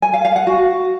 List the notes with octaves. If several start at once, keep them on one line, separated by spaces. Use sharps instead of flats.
G#5
F5
F5
F#5
F#4